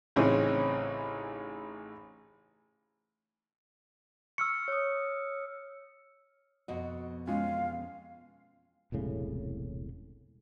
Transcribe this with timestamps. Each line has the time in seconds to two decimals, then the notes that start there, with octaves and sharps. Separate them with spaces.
0.16 A1 C#3 E3 C4 C#4 D#4
4.38 C#6 E6 F6 C#7
4.68 C#5 D#6
6.68 F2 B2 F#4 D#5
7.27 E2 G#3 C#4 F4 F5 G5
8.92 E1 C2 A2 C#3